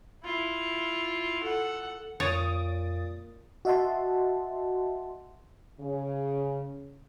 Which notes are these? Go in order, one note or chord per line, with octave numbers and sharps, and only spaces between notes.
E4 F4
A4 F#5
F2 A#2 C#5 D#6 A6 D7
F#4 D#5 E5 F#5 A5 C6
C#3